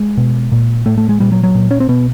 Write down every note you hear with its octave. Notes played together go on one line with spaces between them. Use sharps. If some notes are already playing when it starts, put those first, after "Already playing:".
Already playing: G#3
B2
A#2
A2 A3
A3
G#3
A#2 G3
F#3
F#3
A#2
C#4
C4
B2 B3